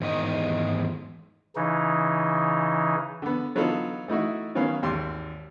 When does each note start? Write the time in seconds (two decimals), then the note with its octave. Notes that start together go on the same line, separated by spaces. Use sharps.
0.01 E2 G#2 D#3 G#3 D#5
1.56 C#3 E3 D#4
3.22 D3 B3
3.55 D3 F#3 B3 D#4 F4 A4
4.08 A3 D#4 E4 F#4
4.55 D#3 F#3 B3 C#4 F5
4.82 G#1 D#2 C6